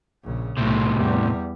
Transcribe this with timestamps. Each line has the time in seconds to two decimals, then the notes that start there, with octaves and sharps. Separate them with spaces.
0.24 A#1 C#3
0.58 B1 A2 C3 A3
0.96 E2 G3